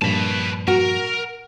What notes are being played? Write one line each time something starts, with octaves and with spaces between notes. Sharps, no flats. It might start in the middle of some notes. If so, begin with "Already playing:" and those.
G2 A#2 F3 B4 A5
F#4 A#4